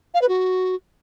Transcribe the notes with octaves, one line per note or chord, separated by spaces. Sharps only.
F5
B4
F#4